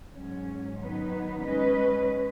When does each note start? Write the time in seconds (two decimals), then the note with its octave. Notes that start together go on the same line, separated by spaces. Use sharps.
0.12 G#2 F#3 C#4
0.77 D#3 F#3 B3 D#4 B4
1.41 G#3 C#4 B4 D#5